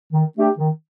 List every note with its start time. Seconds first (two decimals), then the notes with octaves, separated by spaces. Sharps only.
0.13 D#3
0.36 A3 D4 G4
0.58 D#3